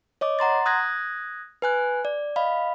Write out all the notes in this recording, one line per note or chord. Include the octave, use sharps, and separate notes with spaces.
C#5 D#5 D6
F#5 A#5 C6 A6
D#6 F#6 G#6 A#6
B4 G#5 F#6
D5
D#5 F5 B5